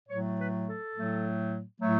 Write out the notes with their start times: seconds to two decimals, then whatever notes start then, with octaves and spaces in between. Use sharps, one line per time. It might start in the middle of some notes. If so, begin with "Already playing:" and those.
0.09 A2 F#3 A3 C#5
0.38 B4
0.67 A4
0.95 A2 F#3 A3
1.80 A2 F#3 A3